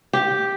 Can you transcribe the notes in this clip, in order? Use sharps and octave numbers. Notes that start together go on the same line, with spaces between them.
G4